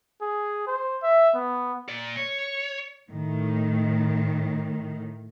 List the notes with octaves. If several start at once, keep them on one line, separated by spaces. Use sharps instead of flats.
G#4
C5
E5
B3
A#2 D5
C#5
A2 D#3